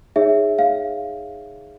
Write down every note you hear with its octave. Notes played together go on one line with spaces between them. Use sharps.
D#4 G#4 C#5 E5
F5